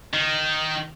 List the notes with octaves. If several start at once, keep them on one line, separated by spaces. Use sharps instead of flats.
D#3